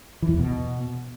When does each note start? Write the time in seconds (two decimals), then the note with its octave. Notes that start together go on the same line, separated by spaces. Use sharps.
0.22 E3
0.28 F#2
0.34 E2
0.39 B2